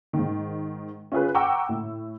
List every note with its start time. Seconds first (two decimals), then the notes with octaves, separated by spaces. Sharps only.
0.13 G#2 D#3
1.12 C#4 F4 G#4 B4
1.35 F#5 G5 A#5 C#6 D6 E6
1.69 A2